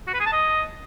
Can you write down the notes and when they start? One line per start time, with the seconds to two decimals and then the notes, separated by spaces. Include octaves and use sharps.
0.07 F#4
0.14 B4
0.20 G#4
0.26 A5
0.33 D#5